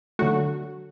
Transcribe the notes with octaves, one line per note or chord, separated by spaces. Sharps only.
D3 F#3 A3 F#4